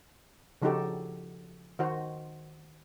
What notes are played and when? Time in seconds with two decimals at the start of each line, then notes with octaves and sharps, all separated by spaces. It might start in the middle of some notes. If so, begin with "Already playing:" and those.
0.62 C#3 F3 D#4 F#4 G4 A4
1.79 D#3 F#4 C5